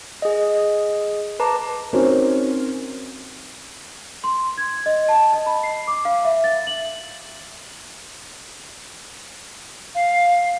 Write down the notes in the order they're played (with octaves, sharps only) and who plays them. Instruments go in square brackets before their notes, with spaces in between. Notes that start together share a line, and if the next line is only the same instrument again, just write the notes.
[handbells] G#4 D#5
B4 A5 A#5 D6
[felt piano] C4 C#4 D#4 F#4 A#4 C5
[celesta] C6
G#6
D#5
A5
D#5
B5
C7
D6
F5
E5
A6
F#7
[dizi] F5